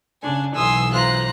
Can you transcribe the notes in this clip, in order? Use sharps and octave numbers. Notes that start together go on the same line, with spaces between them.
C#3 D4 G#5
B1 E3 G#5 C6 D#6 E6
F4 C5 A#5 F#6